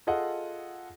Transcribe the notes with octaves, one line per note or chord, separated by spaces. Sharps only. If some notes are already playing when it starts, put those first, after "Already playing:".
F4 G#4 A4 D#5 F#5